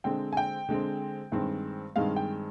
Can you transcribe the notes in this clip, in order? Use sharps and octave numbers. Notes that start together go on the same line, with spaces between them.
D3 G#3 C4 G5
G#5
G5
D3 G#3 C4
G2 D#3 G#3 C4
G2 D#3 G#3 C4 F5
G5